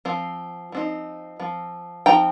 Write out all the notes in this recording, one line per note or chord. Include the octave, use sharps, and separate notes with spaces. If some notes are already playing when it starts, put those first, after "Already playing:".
F3 C4
F3 C4 D#4
F3 C4
F3 C4 D#4 G5 A#5